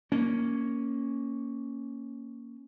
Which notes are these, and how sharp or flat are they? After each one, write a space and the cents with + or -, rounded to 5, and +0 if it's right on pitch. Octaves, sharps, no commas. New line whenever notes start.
A#3 +0 C#4 +0